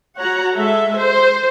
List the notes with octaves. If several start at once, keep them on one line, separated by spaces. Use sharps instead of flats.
F#4 C#5 F#5 A#5
G#3 A4 E5
C5